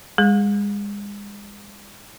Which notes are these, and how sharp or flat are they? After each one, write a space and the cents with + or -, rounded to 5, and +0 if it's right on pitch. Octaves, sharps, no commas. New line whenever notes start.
G#3 -35 G#4 +0